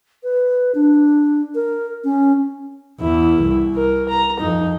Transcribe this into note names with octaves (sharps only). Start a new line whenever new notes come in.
B4
D4
A#4
C#4
E2 E4
C2
A#4
A#5
F2 D#4